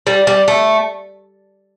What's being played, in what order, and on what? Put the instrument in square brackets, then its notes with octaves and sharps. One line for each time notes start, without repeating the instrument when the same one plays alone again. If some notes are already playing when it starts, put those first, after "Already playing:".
[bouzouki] G3
G3
A3